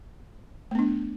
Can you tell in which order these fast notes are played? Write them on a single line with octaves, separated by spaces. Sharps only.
A3 B3 D4